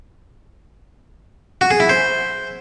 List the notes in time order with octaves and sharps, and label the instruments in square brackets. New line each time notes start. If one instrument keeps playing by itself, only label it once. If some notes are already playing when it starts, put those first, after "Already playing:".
[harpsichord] F#4
G#4
E4
C5